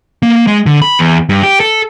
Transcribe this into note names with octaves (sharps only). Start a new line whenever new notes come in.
A#3
G#3
D3
B5
E2
G2
G4
A4